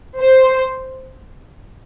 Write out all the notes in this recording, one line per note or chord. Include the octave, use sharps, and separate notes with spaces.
C5